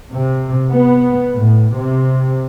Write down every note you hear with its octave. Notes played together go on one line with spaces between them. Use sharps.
C3
B3
A2
C3